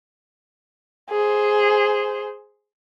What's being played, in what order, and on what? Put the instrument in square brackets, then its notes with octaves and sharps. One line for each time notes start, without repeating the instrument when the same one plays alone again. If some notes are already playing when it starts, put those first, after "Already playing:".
[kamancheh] G#4 C5